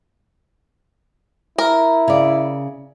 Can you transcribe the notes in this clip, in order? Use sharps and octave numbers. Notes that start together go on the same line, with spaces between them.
E4 A#4
C#3 D5